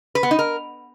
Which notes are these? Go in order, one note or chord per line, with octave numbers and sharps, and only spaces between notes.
B4
B3
D#4
A#4